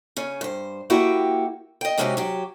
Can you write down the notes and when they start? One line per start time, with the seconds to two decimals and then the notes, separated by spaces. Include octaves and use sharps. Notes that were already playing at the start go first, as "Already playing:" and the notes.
0.17 C#3 C#4
0.41 G2 C5
0.90 A#3 E4 F#4 G4 G5
1.81 D#5 G5
1.98 C3 G#3 C#4 D#4 F#4 G4
2.17 F#3 G4